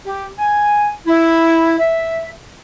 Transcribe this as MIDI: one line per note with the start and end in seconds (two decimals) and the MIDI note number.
0.06 0.27 67
0.39 0.90 80
1.07 1.75 64
1.79 2.29 76